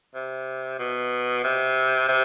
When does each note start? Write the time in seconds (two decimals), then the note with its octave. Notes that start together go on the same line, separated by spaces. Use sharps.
0.15 C3
0.79 B2
1.44 C3
2.09 C3